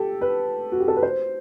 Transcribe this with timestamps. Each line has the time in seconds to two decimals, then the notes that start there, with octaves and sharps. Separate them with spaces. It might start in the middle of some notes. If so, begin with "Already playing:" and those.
Already playing: G4 A4
0.21 B4
0.72 F#4
0.80 G4
0.88 A4
0.96 B4
1.03 C5